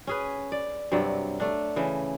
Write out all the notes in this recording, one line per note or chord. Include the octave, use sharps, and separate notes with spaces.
C#4 G#4 B4
D5
G2 C3 F#3 D5
A3 D4
C#3 E3